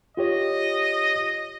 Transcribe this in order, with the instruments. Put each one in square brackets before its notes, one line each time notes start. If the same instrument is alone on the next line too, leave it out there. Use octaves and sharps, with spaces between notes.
[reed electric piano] F4 G4 C#5 [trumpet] D#5